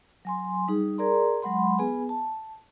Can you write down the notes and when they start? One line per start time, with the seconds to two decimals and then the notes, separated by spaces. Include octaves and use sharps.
0.25 F#3 G#5 C6
0.68 G3 D#4 G#4
0.98 G#4 A#4 D5 A#5 C6
1.42 F#3 G#3 F#5 B5 C6
1.79 B3 G#4 B4 G#5
2.09 A5